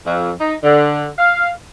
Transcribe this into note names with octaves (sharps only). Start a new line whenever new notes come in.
F2
D#4
D3
F5